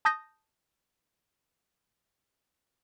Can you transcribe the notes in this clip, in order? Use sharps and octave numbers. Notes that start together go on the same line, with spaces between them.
A5 D#6 G6 A#6